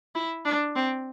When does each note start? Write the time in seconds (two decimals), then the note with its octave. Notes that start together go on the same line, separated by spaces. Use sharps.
0.15 E4
0.45 D4
0.76 C4